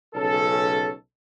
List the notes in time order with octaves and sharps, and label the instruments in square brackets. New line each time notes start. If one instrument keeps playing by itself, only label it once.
[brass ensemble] B1 C#3 C#4 A4